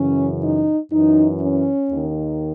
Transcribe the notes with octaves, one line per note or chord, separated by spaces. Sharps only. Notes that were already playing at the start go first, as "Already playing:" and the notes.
Already playing: F#2 C#3 E3 C#4
D#4
F#2 E3 D#4
C#4
D#2 D#3